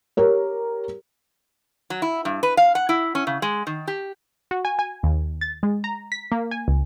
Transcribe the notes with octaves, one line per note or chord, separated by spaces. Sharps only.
G4 A#4 C#5
F#3
E4
G2
B4
F5
F#5
E4
C#4
C#3
G#3
D#3
G4
F#4
G#5
G#5
D#2
A6
G#3
A#5
B6
A#3
G#5
C#2